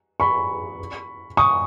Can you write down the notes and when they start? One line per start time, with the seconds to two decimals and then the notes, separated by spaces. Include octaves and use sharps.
0.20 B5 C#6
1.37 C#6 D#6